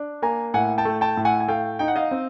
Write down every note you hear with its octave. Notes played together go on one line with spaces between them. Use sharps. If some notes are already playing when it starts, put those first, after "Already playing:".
Already playing: D4
A#3 G#5 A#5
A2 F#5 G#5
G5 A5
A3
G5 A5
A2
F#5 G#5
G#5
A3 F5 G5
D#4 G5
F#5
D#5 F5
C4